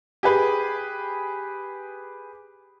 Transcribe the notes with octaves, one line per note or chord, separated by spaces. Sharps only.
G4 G#4 B4